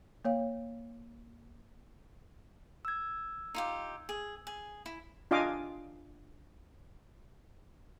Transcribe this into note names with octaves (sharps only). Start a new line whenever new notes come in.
A#3 C#5 F5
E6 G#6
D#4 F4 G4
G#4
G#4
E4
D4 F4 D#5 F5 G#5 D6